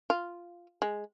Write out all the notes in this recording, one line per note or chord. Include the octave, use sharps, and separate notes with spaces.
F4
G#3